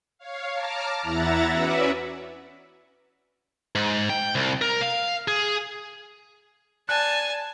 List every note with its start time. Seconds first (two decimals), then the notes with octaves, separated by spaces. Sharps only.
0.18 C#5 F5
0.53 A5 A#5 D6 F6
1.02 E2 E4 E5 F#5 A#5 A6
1.51 C#4 F#4 B4 D5 E5 F#5
3.75 G#2
4.10 G5
4.35 C2
4.62 A#4
4.81 F5
5.28 G#4
6.89 D5 G#5 A5 F#6